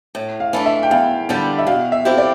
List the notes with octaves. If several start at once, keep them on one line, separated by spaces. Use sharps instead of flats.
A2
F5
E3 A3 D4
E5
G5
E2 F5
D3 G3 B3 D4
E5
B2 F5
E5
A3 C4 E4 G4
D5